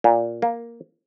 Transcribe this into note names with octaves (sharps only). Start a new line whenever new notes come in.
A#2
A#3